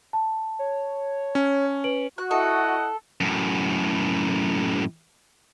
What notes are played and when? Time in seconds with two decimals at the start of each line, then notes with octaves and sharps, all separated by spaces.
0.13 A5
0.59 C#5
1.35 C#4
1.84 B4 D7 F#7
2.18 F#4 F#6
2.31 E4 A4 D#5 F#5
3.21 F#2 A2